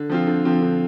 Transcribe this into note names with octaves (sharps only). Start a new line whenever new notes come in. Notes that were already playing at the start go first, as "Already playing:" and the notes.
Already playing: D3
F3 C4 F4
D3
F3 C4 F4
D3